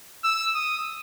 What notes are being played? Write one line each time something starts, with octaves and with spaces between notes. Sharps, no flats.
E6
D#6